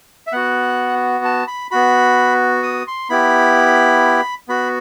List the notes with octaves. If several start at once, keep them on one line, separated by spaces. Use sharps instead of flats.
E5
B3 F#4 F#5
A5
B5
B3 F#4 B5
D#6
C6
B3 E4 G4 B5
B3 F#4 B5